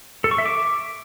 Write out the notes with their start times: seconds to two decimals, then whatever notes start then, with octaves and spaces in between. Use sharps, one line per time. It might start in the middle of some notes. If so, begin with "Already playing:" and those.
0.24 A4
0.31 C#6
0.38 E5
0.46 D6